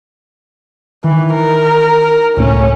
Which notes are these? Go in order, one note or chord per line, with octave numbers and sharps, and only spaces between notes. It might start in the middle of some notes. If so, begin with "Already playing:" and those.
D#3 E3
A#4
C#2 A2 A3 C#4